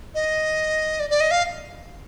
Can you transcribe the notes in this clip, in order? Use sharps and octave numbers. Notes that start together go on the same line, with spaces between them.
D#5
D5
D5
D#5
F5